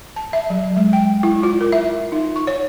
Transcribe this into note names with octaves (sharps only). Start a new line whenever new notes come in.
A5
E5
F#3
G#3
G5
E4
F4
A#4
E5
D#4
C#6
C#5